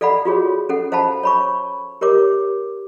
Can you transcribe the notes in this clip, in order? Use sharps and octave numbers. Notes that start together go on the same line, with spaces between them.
A4 D5 F5 F#5 B5
F4 F#4 G#4 C#5
C#4 A4 F#5
C5 F5 F#5 A5 B5
C#5 B5 C#6
G4 A#4 C#5 D6